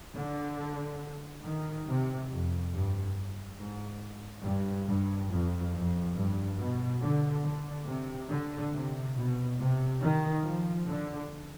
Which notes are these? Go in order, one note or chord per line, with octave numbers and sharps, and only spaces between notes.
D3
D#3
C3
F2
G2
G#2
G2
G2
F2
F2
G2
B2
D3
D3
C3
D3
C3
B2
C3
D#3
F3
D3